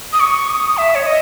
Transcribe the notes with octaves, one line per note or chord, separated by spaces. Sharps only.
D#6
C#6
D#6
E5
C#5
D#5